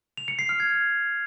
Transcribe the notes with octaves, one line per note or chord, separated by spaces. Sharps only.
F7
C#7
C7
F6
G#6